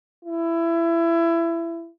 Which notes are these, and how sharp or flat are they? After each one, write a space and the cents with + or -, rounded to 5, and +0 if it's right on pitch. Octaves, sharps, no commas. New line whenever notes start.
E4 +25